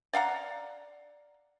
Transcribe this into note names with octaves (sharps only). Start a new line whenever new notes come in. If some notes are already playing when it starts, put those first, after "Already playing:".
D5 F5 F#5 A#5